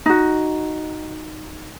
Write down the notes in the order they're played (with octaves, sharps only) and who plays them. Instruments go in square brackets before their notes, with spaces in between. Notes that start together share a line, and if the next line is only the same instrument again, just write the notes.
[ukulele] D#4 F#4